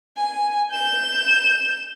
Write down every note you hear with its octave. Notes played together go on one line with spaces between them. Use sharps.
G#5
G6 E7